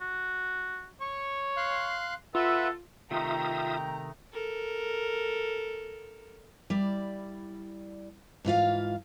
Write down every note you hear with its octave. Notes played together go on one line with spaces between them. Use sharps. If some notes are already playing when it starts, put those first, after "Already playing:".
F#4
C#5 C#6
F5 C6 F#6
F4 A4 B4 E5 F#5
C3 D#3 A3 F4 E5 G5 A#5 D#6
A4 A#4
G3 E4 D5
G#2 E3 F4 F5